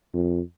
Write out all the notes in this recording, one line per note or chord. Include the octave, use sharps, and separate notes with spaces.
F2